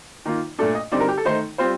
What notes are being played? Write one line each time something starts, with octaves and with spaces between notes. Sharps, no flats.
D#3 A#3 F4
A#2 A3 D4 A4
D#5
D3 G3 C4 D#4 D5
A#4
G4
A4
D#3 A3 D#4 C5
G3 C4 F4 C5